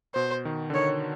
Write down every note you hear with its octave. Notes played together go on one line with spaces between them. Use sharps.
B2 C5
D#3
D3
D#3 C#5